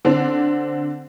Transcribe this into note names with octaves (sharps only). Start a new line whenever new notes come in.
D3 C4 D4